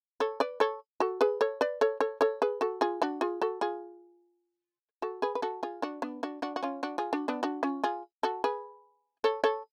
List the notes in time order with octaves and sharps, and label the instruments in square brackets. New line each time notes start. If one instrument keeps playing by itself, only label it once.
[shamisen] A4 C#5
B4 D5
A4 C#5
F#4 A4
G#4 B4
A4 C#5
B4 D5
A4 C#5
A4 C#5
A4 C#5
G#4 B4
F#4 A4
F4 G#4
D4 F#4
F4 G#4
F#4 A4
F4 G#4
F#4 A4
G#4 B4
B4
F#4 A4
F4 G#4
D4 F#4
B3 D4
D4 F#4
D4 F#4
F#4
C#4 F4
D4 F#4
F4 G#4
D4 F#4
B3 D4
D4 F#4
C#4 F4
F4 G#4
F#4 A4
G#4 B4
A4 C#5
A4 C#5